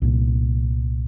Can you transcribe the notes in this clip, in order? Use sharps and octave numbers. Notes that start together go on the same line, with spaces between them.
C2 A#2